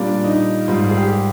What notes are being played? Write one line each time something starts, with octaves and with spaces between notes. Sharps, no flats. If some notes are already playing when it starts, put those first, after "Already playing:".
Already playing: A#2 G3 A#3 D4
D#4
G#2 G3 A#3 F4
G#4
G4